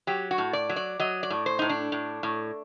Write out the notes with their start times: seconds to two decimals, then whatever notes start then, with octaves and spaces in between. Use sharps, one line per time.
0.07 F#3 G4
0.31 F#4
0.38 A2
0.53 D5
0.69 F#3
0.76 D5
1.00 F#3 D#5
1.23 D5
1.30 A2
1.46 C5
1.59 A2 D#4
1.69 D4
1.92 A2
2.23 A2